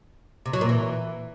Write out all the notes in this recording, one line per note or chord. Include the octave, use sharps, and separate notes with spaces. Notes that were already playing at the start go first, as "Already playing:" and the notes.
C3
F#3
A#2
E3